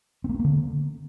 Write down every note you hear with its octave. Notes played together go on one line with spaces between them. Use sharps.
C4
A#3
C#4
A#3
D3